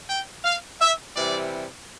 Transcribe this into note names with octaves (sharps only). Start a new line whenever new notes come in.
G5
F5
E5
C3 E3 G3 D5